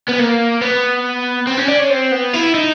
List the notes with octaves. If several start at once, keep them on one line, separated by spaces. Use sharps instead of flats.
B3
A#3
B3
C4
C#4
D4
C#4
C4
B3
E4
D#4